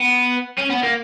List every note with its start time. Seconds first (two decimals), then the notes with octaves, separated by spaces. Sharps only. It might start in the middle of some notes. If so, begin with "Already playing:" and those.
Already playing: B3
0.58 C#4
0.70 B3
0.83 A#3